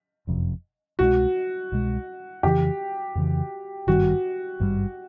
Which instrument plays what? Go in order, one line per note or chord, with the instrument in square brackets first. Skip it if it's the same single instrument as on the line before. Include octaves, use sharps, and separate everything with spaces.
[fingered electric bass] F#1 F2 C3
[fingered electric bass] C2 B2 G#3 [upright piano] F#4
[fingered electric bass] C2 B2 G#3
[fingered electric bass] F2 C#3 E3 [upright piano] G4
[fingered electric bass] F2 C#3 E3
[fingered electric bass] G#1 G2 D#3 G3 [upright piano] F#4
[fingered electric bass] G#1 G2 D#3 G3